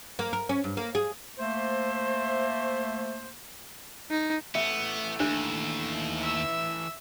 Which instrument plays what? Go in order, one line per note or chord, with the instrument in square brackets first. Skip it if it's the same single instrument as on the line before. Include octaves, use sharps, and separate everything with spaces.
[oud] A#3
A#4
C#4
G2
A#3
G#4
[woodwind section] A3 A#3 C5
[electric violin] D#4
[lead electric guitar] E3 A3 [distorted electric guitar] B3 [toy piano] E5
[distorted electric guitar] D#2 [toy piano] D4 C5
[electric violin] E5 E6